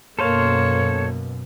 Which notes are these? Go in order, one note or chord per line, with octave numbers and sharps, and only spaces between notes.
F#2 B2 A#3 A4 C5 C#5 F5